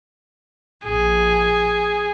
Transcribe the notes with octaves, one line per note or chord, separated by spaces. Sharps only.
A#1 G#4